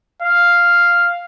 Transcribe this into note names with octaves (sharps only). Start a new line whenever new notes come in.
F5